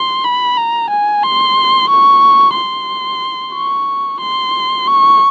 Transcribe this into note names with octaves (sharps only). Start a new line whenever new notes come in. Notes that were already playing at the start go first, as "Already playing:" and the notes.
Already playing: C6
B5
A#5
G#5
C6
C#6
C6
C#6
C6
C#6